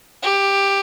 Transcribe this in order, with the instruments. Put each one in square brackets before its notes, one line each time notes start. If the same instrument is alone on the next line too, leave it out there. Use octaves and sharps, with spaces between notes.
[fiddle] G4